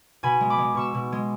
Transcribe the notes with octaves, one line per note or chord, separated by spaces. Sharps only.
B2 G#5 B5
G#3
B5 D6
G#3
B2 C#6 E6
B2
G#3